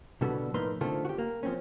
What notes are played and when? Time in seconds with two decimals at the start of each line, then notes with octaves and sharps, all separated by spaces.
0.21 B2 D3 G3 B3 F#4 A4
0.54 A2 F3 A#3 D#4 B4 C6
0.81 D3 D#3 A3 C4 F4
1.05 F#4 G4
1.18 A#3
1.43 F3 C4 C#4